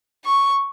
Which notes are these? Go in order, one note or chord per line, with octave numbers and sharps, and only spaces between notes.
C#6